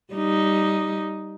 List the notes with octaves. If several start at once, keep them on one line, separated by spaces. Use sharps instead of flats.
G3 D#4